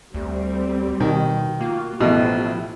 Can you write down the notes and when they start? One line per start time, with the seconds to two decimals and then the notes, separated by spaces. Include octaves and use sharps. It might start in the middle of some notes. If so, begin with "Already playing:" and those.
0.14 D2 G3 C4
1.00 B2 D#3
1.61 A#3 F4 F#4
2.00 A1 B2 F3 E4 F4 G4